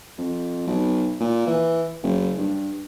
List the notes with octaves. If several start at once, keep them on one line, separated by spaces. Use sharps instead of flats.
F2
B1
A#2
E3
F#1
G2